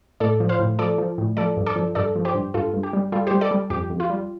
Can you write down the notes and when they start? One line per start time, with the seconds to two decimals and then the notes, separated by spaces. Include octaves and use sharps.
0.20 A2 A4 D5
0.40 F3
0.49 C5 F5
0.59 A2
0.79 F3 A4 D5
0.98 F3
1.18 A2
1.37 F3 A4 D5
1.57 G2
1.66 A4 D5
1.76 F3
1.95 G2 A4 D5
2.16 F3
2.25 G4 C5
2.35 G2
2.54 G2 F4 A4
2.73 G2
2.83 G4
2.93 G3
3.12 G3 F4 A4
3.27 G3 G4 C5
3.41 A4 D5
3.51 G3
3.70 F2 G4
3.90 F2
4.00 F4
4.10 G3